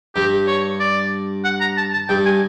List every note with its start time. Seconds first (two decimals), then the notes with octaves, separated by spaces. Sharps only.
0.15 G2 G4
0.47 C#5
0.80 D5
1.45 F#5
1.61 A#5
1.77 A5
1.93 A5
2.09 G2 G5
2.26 G#5